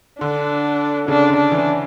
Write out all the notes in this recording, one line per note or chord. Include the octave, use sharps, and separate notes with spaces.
D3 D4
C#3 D4
D3
D4
E3